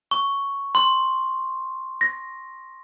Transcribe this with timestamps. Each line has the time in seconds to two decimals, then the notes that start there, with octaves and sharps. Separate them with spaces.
0.11 C#6
0.75 C6
2.01 A#6